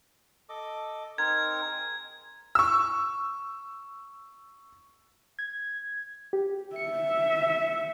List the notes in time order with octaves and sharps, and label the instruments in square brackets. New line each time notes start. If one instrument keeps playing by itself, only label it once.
[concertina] A4 D#5 D6
[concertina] C4 D#4 A#4 [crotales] G#6
[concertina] G#4
[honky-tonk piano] C#6 E6
[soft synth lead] G#6
G4
[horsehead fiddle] E5 [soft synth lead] C#7